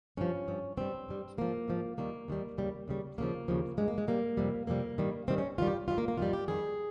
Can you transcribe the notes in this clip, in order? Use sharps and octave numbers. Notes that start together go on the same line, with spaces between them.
G2 F3 C#4
G2 F3
G2 G3 C4
G2 G3
G#2 F3 A#3
G#2 F3
D#2 D#3 G3 A#3
D#2 D#3 G3
D#2 C#3 G3
D#2 C#3 G3
D#2 C#3 F3 A#3
D#2 C#3 F3
G2 G3 G#3
A#3
G#3
G2 G3 A#3
F2 C3 G3
F2 C3 G3 A#3
G2 D#3 G3
G2 D#3 G3 C4
C#4
G2 D#3 G3 F4
G4
G2 D#3 G3 F4
A#3
A#3
F2 D#3 G3 F4
G4
F2 D#3 G3 G#4